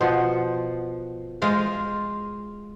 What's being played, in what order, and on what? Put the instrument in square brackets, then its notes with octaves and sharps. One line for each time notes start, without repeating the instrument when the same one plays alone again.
[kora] B2 F3 F#5 [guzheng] C5
[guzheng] G#3 F4 C5